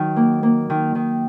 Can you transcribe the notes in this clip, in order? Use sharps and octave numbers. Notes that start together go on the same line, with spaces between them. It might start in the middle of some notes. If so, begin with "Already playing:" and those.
Already playing: D#3 F#3
A#3
A#3
D#3
D#3